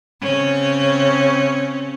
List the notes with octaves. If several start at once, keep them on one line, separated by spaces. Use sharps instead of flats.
C#3 C4 C#4